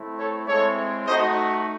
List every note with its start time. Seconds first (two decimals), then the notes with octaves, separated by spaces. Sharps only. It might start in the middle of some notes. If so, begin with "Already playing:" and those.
Already playing: A3 C4 E4
0.18 A4 C#5
0.47 G#3 C4 E4 A4 C#5
1.07 A3 D#4 F#4 C5 D#5